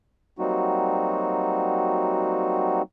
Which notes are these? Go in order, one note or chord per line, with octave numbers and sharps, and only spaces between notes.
F#3 G3 A#3 C4 D#4 F#4